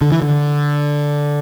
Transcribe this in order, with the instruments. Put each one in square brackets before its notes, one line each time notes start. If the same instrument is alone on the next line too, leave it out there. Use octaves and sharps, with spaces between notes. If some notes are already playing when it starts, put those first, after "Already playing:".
[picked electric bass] D3
E3
D3